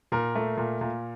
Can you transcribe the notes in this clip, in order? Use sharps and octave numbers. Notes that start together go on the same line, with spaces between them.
A#2 A#4
A3
A#2
A#2